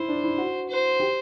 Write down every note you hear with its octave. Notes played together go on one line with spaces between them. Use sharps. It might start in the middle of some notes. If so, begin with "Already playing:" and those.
Already playing: E4 C5
D4
E4
F#4
C5
G4